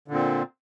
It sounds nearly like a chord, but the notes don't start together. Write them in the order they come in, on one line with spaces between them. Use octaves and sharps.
D3 A#2 C4